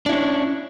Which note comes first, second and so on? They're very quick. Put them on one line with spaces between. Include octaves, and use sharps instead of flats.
D4 E4 C#4